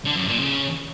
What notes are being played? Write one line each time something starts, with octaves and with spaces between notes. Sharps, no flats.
D3
F#2
A#2
C#3